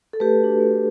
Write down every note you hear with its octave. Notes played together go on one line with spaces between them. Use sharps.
A4
A3 G4 B4
D4 F#4
A3